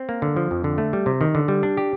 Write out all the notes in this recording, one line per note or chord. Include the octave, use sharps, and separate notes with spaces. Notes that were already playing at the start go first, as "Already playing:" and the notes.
Already playing: C4
A#3
D3
F3
F2
D3
A3
G3
C3
D#3
D3
G3
D4
G4